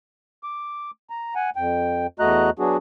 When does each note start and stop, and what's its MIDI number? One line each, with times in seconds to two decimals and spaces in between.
0.43 0.91 86
1.10 1.34 82
1.35 1.50 78
1.35 1.50 80
1.56 2.07 41
1.56 2.07 79
2.19 2.50 40
2.19 2.50 57
2.19 2.50 66
2.19 2.50 75
2.19 2.50 82
2.19 2.50 90
2.59 2.77 54
2.59 2.77 59
2.59 2.77 62
2.59 2.77 66
2.59 2.77 68